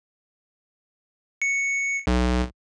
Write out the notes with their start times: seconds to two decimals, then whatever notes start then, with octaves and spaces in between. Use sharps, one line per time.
1.42 C#7
2.07 B1